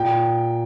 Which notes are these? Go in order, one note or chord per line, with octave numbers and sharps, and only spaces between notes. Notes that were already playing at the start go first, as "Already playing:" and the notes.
Already playing: A#2 G5